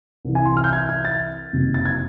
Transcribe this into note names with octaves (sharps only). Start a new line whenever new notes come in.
C2 C3 E3
G#5
C6
F6
G6
G#6
G#6
A6
F#1 F2 C3 D#3 F#3
A6
G#6